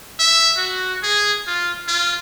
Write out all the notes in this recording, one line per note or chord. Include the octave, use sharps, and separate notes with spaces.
E5
F#4
G#4
F4
F4